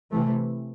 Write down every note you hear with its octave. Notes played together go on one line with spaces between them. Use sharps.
C3 E3 A3